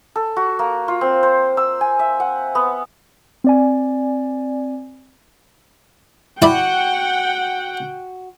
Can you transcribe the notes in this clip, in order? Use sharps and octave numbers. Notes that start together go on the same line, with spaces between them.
A4
F#4
A#3
F4
C4
C5
E6
G#5
E5
F#5
B3
C4 D5 G#5
E4 F#4 D5 F#5 G5 B5